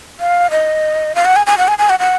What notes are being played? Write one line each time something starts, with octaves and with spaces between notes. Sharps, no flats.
F5
D#5
F5
F#5
G#5
G#5
F#5
G#5
G#5
F#5
F#5